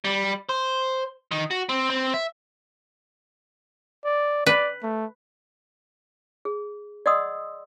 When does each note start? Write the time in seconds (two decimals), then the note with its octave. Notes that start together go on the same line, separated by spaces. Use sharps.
0.04 G3
0.49 C5
1.31 D#3
1.51 F#4
1.69 C4
1.90 C4
2.14 E5
4.05 D5
4.46 B4 D5
4.83 A3
6.45 G#4
7.06 D5 D#5 F#5 C6 D#6 E6